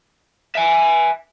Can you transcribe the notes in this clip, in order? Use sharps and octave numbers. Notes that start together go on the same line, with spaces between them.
E5 G#5